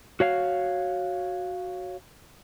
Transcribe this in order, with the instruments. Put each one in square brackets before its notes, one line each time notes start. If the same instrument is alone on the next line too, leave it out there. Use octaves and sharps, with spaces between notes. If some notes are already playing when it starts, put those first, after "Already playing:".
[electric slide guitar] F#4 C#5 F5